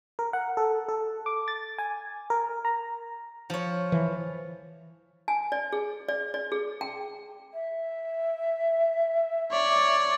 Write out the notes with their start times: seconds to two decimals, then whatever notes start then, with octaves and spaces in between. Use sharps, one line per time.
0.19 A#4
0.33 F#5
0.57 A4
0.89 A4
1.26 D6
1.48 A6
1.78 G#5
2.30 A#4
2.65 A#5
3.50 F3 C#5
3.92 E3
5.28 G#5
5.52 D5
5.72 G#4
6.09 D5
6.34 D5
6.52 G#4
6.81 G5
7.54 E5
9.52 C#5 D5